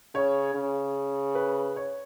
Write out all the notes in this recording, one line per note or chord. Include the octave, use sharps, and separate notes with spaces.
C#3 C#5
C#3
B4
C#5